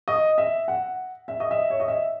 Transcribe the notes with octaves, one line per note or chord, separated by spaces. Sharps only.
D#5
E5
F#5
E5
D#5
E5
C#5
D#5
E5